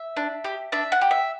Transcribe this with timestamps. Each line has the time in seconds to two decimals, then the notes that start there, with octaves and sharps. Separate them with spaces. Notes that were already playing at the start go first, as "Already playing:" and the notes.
Already playing: E5
0.17 D4
0.44 G4
0.72 D4 E5
0.92 F#5
1.01 G4
1.11 E5